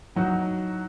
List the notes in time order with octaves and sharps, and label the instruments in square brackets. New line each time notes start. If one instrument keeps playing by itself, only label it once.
[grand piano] A2 F#3 D#4 F#4